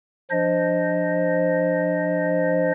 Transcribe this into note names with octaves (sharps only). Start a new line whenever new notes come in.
F3 D4 C5 D#5